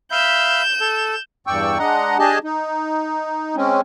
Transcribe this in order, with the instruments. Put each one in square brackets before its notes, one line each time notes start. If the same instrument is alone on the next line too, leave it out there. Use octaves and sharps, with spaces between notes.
[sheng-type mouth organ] E5 F5 B5 [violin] G6 E7
[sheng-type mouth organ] A4
[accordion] E2 G2 D5 G5 C#6 E6
G#3 D4 D#5 F#5 A#5
D4 G4 G#4 D#5 G#5 A5
D#4
G#3 C4 C#4